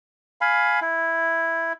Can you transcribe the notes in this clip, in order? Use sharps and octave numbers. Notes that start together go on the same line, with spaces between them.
F5 G#5 B5
E4